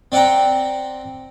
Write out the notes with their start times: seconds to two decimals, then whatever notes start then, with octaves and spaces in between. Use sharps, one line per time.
0.12 C4 D5 F#5 G5 A#5